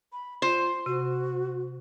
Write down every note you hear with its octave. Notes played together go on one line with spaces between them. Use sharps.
B5
F4 C5
C3 F#4